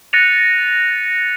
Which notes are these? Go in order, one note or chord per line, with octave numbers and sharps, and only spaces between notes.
F#6 A6 A#6 C#7 D#7 F7